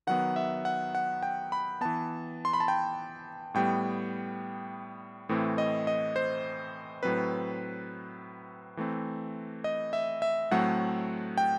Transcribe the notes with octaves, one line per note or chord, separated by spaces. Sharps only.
D#3 F#3 B3 F#5
E5
F#5
F#5
G5
B5
E3 B3 A5
C6
B5
A5
G5
A2 G3 B3 G5
A2 E3 A3 C4
D#5
D#5
C5
A2 F#3 C4 B4
E3 A3 C4
D#5
E5
E5
A2 F#3 A3 C4 F#5
G5